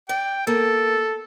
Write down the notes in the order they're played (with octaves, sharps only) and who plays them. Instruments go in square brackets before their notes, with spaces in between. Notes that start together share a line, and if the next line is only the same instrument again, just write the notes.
[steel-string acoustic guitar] D5 [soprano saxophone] G5
[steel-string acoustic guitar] A#3 [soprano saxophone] A4